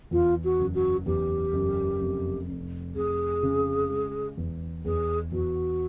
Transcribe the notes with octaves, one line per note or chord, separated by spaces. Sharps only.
E2 F4
F#4
F#1
F#4
E2 G4
F#1
F1
F1
F1 G#4
C#3
G#3
E2
E2 G#4
E2 F#4